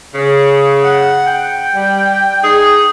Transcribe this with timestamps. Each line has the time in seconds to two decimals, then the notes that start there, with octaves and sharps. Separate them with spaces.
0.15 C#3
0.83 F#5
1.26 G5
1.75 G3
2.43 D#4 G#4